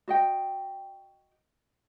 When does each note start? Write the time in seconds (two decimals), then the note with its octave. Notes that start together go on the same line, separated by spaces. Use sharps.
0.08 F#4 D#5 G5